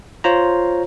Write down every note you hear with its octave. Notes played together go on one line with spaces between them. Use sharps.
F4 C5 C#5 A#5